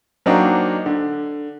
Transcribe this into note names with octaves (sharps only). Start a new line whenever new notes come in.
F#3 A#3 C4 D4 D#4 F#4
D3